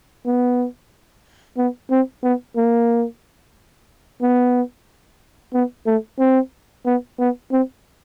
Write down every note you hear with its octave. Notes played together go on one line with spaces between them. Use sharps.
B3
B3
C4
B3
A#3
B3
B3
A3
C4
B3
B3
C4